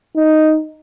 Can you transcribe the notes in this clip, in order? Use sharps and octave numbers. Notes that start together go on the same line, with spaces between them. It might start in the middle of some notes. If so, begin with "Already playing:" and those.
D#4